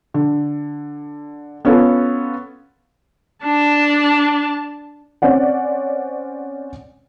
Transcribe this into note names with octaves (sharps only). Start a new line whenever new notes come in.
D3
B3 C#4 F4 A4
D4 A5
C4 C#4 D5 F#5